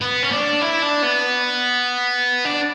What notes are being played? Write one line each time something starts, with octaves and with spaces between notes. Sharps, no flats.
B3
C#4
D4
E4
D4
B3
D4